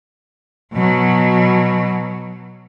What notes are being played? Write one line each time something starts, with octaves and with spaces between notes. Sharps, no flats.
B2 F#3